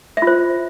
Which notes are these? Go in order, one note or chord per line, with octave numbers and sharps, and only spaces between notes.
E5
F4
C5